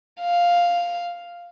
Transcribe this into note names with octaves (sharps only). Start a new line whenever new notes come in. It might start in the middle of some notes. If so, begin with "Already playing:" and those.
F5